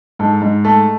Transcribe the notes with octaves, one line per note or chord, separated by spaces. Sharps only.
G#2 A4
G#2
A3 A4